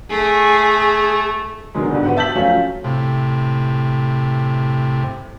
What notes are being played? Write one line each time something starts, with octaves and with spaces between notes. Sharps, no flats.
A3 G#4
B2 D3 D#3 F#3 G#3
G#2 B2 D3 G3
B3 F#4 G4 C5 F#5
E5 A5 G6 B6 F#7
F3 F#3 A3 C#4 F4
A2 C3